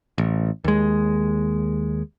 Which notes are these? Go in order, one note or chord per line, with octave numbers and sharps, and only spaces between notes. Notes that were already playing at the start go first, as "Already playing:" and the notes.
A1
D#2 G#3